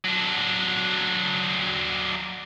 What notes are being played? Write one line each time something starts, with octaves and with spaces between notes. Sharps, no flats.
F#3 D4